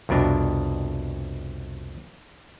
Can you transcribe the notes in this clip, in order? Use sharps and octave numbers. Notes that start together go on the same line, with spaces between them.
C2 F2 B2 D4